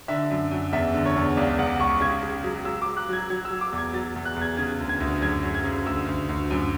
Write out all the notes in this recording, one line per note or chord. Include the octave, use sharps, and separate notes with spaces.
D3 E5
F#2
F#2
E2 E5
D3
C#5
E2
C#2 D5
C#2 F#5
C#2 C#6
C#3 G#6
C#3
F#3
F#3 E6
F#3 D6
F#6
F#3 G#6
F#3 G#6
E6
F#3
D6
E2
G#6
F#3 A6
E2
F#6
E2
G#6
C#3 G#6
D2
G#6
D2
F#2 G#6
F#2
G#6
C#3
D2 E6
D2
D2
F#2